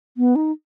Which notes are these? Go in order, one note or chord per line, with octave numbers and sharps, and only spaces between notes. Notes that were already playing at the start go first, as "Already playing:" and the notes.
B3
D#4